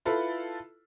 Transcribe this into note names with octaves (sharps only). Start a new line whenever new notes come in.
E4 F4 A4 B4